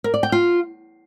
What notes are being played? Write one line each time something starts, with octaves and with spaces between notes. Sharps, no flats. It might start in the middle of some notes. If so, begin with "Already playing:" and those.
A#4
D5
G5
F4